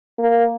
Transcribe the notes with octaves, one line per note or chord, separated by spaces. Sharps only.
A#3